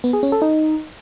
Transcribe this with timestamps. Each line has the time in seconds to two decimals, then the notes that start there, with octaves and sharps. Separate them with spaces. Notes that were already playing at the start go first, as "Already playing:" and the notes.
0.04 B3
0.13 G#4
0.23 C#4
0.32 A4
0.42 D#4